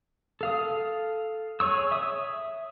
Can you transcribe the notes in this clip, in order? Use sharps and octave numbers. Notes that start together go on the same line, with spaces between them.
A4 F5 D#6
G#4 C#5 C#6 E6
E5 D#6